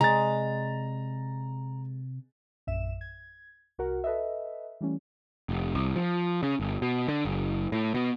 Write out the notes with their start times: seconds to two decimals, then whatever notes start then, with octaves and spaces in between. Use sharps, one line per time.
0.01 C3 G#3 D5 A#5 A6
2.67 A#1 F#2 E5 E7
3.01 G#6
3.78 C2 F#4 A#4 F#5
4.04 A4 B4 D#5 E5
4.81 E3 G3 A3 C#4
5.49 F1
5.75 C2
5.96 F3
6.43 C#3
6.60 G1
6.82 B2
7.08 D3
7.25 F#1
7.72 A2
7.94 B2